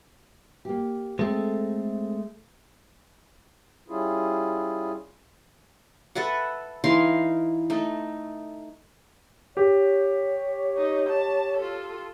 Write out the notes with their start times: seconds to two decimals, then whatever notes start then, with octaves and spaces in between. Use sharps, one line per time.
0.65 A#3 G4
1.19 G#3 A3 C4 A4
3.88 G3 C#4 E4 F4 G#4
6.15 A4 B4 E5 F#5
6.84 E3 D#4 F5 C6
7.70 A3 D#4
9.57 G4 C#5
10.77 D#4
11.09 A5
11.57 F4 A4